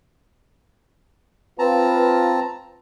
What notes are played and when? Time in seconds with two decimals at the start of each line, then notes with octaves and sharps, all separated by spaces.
1.59 C4 F4 B4 A5 A#5